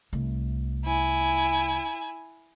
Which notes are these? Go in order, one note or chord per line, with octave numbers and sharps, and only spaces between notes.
C2 A3
E4 G#5